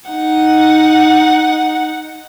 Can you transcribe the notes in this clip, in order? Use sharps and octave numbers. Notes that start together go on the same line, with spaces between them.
D#4 F#5